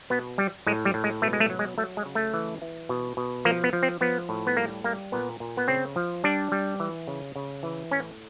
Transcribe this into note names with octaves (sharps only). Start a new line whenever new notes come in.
B2 B3
G3
A2 G#3
G3
A2
G#3
B2 A3
G#3
A3
F#3
G#3
F#3 A3
G#3
C#3
A3
E3
E3
B2
B2
F3 A#3
B3
F3
C4
F3 B3
A2
B3
G3 A#3
G3 A#3
A#2 B3
A#2
B3
C#3 C4
F3
G3 D4
G3
E3
C#3
C#3
E3
A2 C#4